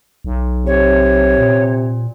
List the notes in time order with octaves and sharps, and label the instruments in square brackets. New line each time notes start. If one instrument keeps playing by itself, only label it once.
[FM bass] B1
[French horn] C3 [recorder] C#5
[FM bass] A#2